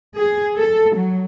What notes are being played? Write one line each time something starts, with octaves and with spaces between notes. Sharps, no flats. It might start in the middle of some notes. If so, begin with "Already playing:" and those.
G#4
A4
F#3